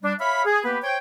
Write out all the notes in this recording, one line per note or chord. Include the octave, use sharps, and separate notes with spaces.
G3 D4
C#5 E5 F5 B5
G#4
A#3 B3 G4 B4
C5 C#5 G5